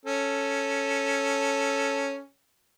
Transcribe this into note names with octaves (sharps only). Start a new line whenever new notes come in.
C#4 A4